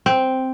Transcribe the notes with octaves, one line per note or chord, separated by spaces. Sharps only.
C4